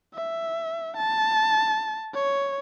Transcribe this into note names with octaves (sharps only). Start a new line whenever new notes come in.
E5
A5
C#5